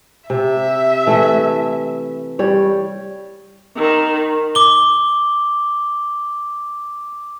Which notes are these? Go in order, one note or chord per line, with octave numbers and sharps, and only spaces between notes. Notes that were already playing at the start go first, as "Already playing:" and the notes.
C3 E5
E3 A3 E4
G3 C#5
D#3
D6 G7